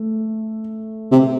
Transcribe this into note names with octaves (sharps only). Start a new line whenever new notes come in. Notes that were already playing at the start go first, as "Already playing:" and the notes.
Already playing: A3
C3